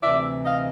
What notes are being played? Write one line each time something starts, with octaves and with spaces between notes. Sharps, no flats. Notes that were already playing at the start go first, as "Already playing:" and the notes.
D2 C3 E3 D5 E5
D#5 F5